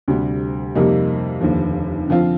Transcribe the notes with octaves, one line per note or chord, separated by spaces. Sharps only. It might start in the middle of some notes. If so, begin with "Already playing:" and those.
D2 C3 G3
F2 C3 G3 A#3 D#4
F1 D#2 D3 F3
D3 F3 C4 F4